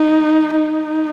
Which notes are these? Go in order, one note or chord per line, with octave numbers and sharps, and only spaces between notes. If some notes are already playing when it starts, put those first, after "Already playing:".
Already playing: D#4
D#4